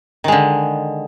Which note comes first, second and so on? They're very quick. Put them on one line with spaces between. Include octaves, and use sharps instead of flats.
D#3 G#3 D3